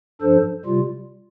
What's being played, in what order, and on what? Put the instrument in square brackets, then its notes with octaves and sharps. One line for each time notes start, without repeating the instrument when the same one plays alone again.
[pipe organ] G2 F3 D4 A4 C5
C3 G3 F4